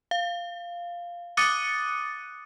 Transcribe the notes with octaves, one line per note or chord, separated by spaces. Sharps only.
F5
D6 D#6 F#6 A6 C#7 D#7